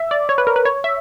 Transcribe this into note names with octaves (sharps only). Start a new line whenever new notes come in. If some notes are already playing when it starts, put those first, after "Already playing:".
Already playing: E5
D5
C#5
B4
A#4
B4
C#5
E5